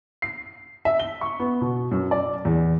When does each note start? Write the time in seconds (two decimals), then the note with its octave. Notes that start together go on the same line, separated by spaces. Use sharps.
0.22 C7
0.85 E5
1.00 G7
1.21 C#6
1.40 B3
1.61 B2
1.91 F#2
2.11 D5
2.45 E2